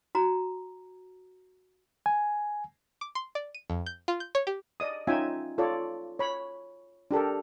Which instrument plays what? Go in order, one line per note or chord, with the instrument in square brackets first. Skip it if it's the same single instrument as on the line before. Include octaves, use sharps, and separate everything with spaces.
[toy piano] F#4 A#5
[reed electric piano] G#5
[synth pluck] D6
C6
D5
D#7
F2
G6
F4
G6
C#5
G4
[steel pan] D5 D#5 D#6
C#4 D#4 F4 E5 G5 G#5
F4 A4 C#5 D5
C#5 B5
D4 G4 A4 A#4